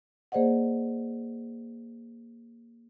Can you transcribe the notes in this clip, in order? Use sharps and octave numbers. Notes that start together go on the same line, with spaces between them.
A#3 G#4 C5 D5 D#5 F#5